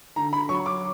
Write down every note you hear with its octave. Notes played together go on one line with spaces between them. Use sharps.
D3 A#5
B5
F#3 C#6
D6